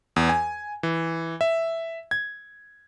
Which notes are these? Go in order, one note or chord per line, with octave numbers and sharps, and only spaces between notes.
E2
G#5
E3
E5
G#6